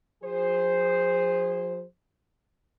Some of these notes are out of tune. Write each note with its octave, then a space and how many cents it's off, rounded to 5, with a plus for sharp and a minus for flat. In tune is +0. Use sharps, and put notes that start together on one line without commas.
F3 +40 G#4 -30 C5 +0